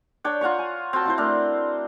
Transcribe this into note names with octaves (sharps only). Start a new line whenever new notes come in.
D4 C#5 G5
F4 F#5 A#5 C#6
G#5
C4 F#4 G5 A5
C4 E4 C5
A3 C4 D4 A#4